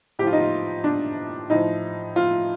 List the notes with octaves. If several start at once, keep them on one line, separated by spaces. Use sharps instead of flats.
A2 F3 F4 G4
D#4
F4
D4
A2 F3 D#4
F4